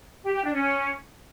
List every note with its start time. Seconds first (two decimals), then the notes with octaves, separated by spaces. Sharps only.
0.23 G4
0.33 G4
0.43 D4
0.54 C#4